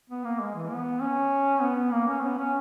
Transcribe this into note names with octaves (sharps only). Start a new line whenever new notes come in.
B3
A#3
G#3
E3
B3
C#4
B3
A#3
C#4
B3
C#4